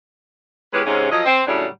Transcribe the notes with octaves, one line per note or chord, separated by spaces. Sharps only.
E2 G#3 C#4 G4 B4
G#2 C3 C#4
F3 F#3 A4 D#5
C4
A2 C#3 F#3 G3 D4 F#4